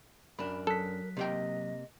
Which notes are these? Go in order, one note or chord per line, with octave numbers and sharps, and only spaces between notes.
F#2 D4 A#4 B5
F#3 A4 F#6 B6
C3 A#3 D#5 G5